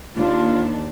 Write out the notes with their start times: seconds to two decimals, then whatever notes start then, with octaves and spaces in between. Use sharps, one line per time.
0.15 D#2 D4 F4